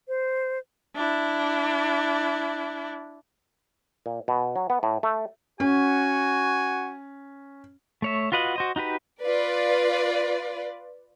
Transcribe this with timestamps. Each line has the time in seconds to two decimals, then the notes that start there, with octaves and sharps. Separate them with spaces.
0.08 C5
0.96 D4 E4
4.06 A#2
4.28 B2
4.56 F#3
4.70 B3
4.83 A2
5.03 A3
5.60 C#4 F#4 G#5
8.02 A3 C#5 E5
8.32 F4 F#4 B4 D#5 F#5
8.56 F#4 C5 D#5
8.76 D#4 F#4 G4 B4
9.21 F4 B4 D5